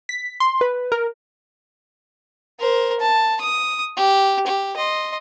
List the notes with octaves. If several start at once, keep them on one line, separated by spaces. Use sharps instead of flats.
B6
C6
B4
A#4
A#4 C5
A5
D#6
G4
G4
D#5 C6